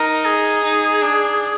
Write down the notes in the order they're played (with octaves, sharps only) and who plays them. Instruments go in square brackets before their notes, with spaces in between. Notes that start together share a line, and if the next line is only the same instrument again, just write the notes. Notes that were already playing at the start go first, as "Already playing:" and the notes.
Already playing: [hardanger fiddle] D#4 [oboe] A#4
[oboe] G#4
[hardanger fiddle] D#4
D4